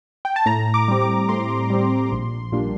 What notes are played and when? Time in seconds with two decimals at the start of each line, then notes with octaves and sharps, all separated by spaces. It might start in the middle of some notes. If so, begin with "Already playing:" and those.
0.25 G5
0.36 A5
0.46 A2 A#5
0.74 D6
0.88 G3 C4
1.02 D6
1.29 A2 C6
1.70 G3 C4
2.12 A#1
2.52 A#2 G3 A#3 D4